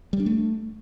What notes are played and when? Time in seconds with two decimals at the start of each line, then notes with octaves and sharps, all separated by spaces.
0.13 G3
0.20 D4
0.26 A3